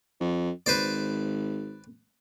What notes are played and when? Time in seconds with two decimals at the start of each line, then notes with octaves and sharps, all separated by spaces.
0.20 F2
0.66 G#1 B4 C5 D5